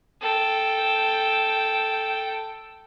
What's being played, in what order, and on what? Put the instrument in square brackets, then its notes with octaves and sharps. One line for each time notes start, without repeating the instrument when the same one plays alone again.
[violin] A4 G5